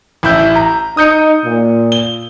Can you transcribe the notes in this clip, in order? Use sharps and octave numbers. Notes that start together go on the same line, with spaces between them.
A1 E4 G6
A#5
D#4 D#6 G6 C#7
A#2
G7